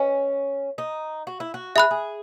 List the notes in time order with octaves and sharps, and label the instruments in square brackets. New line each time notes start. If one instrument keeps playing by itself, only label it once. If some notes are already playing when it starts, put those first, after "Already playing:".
Already playing: [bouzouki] C#4 [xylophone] B4 D#5 G#5
[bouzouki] D#4
F#4
E4
F#4
[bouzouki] G#4 [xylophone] E5 B5 F#6
[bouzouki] G#4